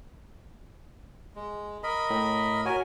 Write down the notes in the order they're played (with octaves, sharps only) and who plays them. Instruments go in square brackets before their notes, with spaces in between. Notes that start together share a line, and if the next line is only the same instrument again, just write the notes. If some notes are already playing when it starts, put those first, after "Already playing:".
[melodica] G#3
A#4 D#5 B5
[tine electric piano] A2
[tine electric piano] F#4 C#5 [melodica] A#4 G#5